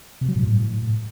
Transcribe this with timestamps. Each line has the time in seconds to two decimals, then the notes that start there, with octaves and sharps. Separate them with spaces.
0.21 C3
0.28 F#3
0.36 G#2
0.43 A2